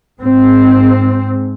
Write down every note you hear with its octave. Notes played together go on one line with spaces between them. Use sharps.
G#2 C4